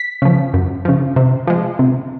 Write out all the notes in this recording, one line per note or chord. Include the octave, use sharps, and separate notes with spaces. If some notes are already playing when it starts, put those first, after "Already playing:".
Already playing: B6
C#3 F3
F#2
C#3 F3
C3
F3 G#3
C3